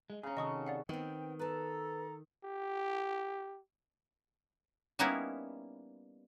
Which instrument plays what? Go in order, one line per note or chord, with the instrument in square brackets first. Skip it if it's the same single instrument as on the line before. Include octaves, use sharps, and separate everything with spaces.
[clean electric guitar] G#3
[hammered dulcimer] C#3 A#5 [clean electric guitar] C#4 G#4
[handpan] C3 D#3 C4 [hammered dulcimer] F#4 A4 [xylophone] D#5 C#6 D#6
[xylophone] D5 F5 F#5
[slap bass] D#3 [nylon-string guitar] B3 C4 [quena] G5
[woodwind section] A4 [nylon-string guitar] B4 A5 [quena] A#5
[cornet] G4
[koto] G3 A#3 B3 C#4 D#4 E4